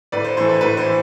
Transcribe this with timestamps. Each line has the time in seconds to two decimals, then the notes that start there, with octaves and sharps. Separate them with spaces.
0.12 A2 B4 D5
0.24 C5
0.37 E3 A3 C5
0.49 B4
0.61 A2 B4
0.77 C5
0.86 E3